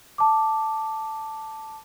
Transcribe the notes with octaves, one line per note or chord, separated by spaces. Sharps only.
A5 D6